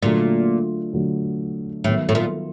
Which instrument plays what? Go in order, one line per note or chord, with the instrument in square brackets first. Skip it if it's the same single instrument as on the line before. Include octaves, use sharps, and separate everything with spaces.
[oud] A#2 [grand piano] D3 F#3 A3
[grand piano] D3 F#3 A3
[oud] A2 [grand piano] D#3 F#3 B3
[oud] A2
A#2